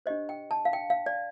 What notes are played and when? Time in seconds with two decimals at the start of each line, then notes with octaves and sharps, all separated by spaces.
0.06 D4 G4 C5 D#5
0.29 G5
0.51 A5
0.65 F5
0.73 G5
0.90 F5
1.06 D5